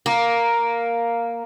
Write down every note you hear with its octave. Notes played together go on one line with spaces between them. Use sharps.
A#3